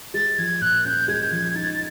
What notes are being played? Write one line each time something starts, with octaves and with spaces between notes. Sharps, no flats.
G#3 A6
F3 G#6
A#2 F#6
C#4 G6
G#3 G#6
G6
F3 G#6
D#4 A6
A6